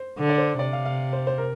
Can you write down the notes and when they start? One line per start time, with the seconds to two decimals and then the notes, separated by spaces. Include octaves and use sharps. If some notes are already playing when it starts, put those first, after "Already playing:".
Already playing: C5
0.19 D3
0.29 D5
0.38 C5
0.59 C3 D5
0.73 F5
0.86 F5
1.13 C5
1.27 C5
1.38 A#4